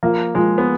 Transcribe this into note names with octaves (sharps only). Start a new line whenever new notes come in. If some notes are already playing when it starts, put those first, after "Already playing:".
F3 A#3
F3 G#3
B3